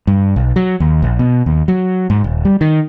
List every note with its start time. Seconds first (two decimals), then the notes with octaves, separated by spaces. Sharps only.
0.07 G2
0.36 B1
0.56 F#3
0.80 D#2
1.02 A#1
1.19 B2
1.46 D#2
1.68 F#3
2.10 G#2
2.24 D#1
2.45 G3
2.61 D#3